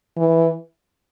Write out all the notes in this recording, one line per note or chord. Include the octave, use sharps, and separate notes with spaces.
E3